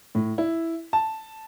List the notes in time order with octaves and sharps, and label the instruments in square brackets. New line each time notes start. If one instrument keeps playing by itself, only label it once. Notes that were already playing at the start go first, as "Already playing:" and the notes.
[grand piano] A2
E4
A5